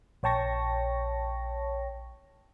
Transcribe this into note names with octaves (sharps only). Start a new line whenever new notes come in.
A#1 C#5 G5 A5 C#6 A#6